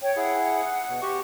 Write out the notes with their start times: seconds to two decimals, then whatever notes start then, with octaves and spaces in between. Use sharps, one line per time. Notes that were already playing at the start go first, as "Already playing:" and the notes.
0.02 C#5 G5
0.16 E4 G#4 F#5
0.89 B2
1.02 F#4 G4 C#6